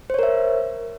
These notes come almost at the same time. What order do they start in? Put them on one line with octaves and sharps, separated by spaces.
C5 C#5 A#4 E5